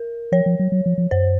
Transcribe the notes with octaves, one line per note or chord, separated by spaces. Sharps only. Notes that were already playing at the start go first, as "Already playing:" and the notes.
Already playing: A#4
F3 C#5
F3
F#3
F#3
F3
F3
F#2 C5